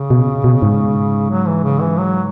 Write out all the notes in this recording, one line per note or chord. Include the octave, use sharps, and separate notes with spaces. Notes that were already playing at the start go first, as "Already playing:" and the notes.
Already playing: C#3
B2
B2
G#2
F#3
E3
C#3
E3
F#3